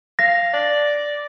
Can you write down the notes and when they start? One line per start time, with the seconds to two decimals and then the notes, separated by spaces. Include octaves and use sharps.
0.19 F5 A#6
0.54 D5